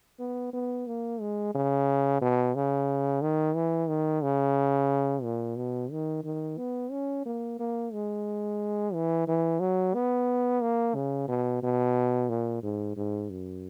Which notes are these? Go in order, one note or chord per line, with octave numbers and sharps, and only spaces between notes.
B3
B3
A#3
G#3
C#3
B2
C#3
D#3
E3
D#3
C#3
A#2
B2
D#3
D#3
B3
C#4
A#3
A#3
G#3
E3
E3
F#3
B3
A#3
C#3
B2
B2
A#2
G#2
G#2
F#2